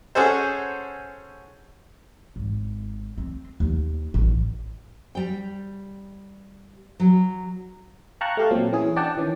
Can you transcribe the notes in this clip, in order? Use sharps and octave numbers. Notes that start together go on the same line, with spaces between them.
C#4 F#4 G#4 A4 C5
G#1
C4
D#2
A1 D#2
G3 G5
F#3
F5 G5 A5 A#5 C#6 F#6
A3 G4 F5
A#2 F#3 C4
E3 C#4 E4 G#4
D4 D5 F#5 G5 A5
D#3 E3 C#4